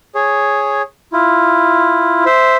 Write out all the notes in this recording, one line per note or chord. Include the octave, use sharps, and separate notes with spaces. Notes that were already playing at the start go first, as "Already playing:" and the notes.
G#4 C#5
E4 F4
C5 E5